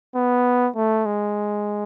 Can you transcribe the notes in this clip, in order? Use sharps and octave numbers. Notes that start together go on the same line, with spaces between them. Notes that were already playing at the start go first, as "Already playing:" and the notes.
B3
A3
G#3